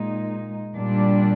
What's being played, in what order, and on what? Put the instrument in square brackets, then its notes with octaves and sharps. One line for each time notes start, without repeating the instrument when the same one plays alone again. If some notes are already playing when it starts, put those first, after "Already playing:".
Already playing: [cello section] A#2 G#3 D#4
A#2 G3 D4